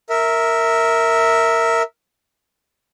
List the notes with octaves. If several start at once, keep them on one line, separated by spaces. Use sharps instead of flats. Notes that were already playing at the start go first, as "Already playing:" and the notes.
A#4 E5